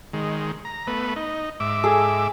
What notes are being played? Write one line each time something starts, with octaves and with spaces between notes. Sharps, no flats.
D#3 G#3
A#5
A3 B3 B4
D#4
G#2 E5 D6
G#4 A4